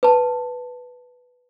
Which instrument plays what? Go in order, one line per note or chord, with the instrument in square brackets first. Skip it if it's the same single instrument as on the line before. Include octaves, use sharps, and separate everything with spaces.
[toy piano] B4 A5